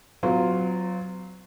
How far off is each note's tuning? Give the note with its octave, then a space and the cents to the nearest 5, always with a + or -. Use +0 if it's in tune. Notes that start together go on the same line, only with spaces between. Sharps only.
F#3 +0 C4 -45 F4 +0